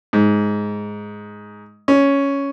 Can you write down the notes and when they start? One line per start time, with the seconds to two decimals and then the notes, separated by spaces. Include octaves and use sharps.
0.13 G#2
1.88 C#4